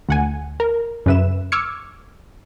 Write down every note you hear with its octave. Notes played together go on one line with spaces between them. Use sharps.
D2 F#5 G#5
A#4
F#2 C#3 B4 E5 E7
C#6 D6 E6 F6 G#6 C#7